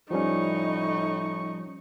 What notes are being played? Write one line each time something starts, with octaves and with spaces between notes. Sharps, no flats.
A2 F3 G3 C#4 D#4 C#6